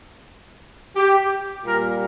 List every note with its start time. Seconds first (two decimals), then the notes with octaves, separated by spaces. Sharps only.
0.96 G4
1.64 A#2 G3 A#3 A#4